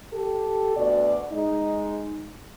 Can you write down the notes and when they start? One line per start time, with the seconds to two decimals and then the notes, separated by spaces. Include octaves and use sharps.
0.13 G4 A4
0.76 D2 B2 F#4 D5
1.32 G#3 D#4